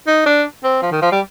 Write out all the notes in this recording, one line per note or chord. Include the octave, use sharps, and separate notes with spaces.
D#4
D4
C4
F3
D#3
F3
G3